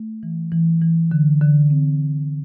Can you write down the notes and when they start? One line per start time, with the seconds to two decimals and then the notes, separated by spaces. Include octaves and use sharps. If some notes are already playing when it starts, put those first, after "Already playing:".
Already playing: A3
0.23 E3
0.52 E3
0.82 E3
1.11 D3
1.41 D3
1.70 C4